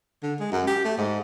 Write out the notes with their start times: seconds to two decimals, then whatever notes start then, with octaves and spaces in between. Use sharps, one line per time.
0.23 D3
0.40 G#3
0.52 F#2
0.67 G4
0.84 A3
0.98 G#2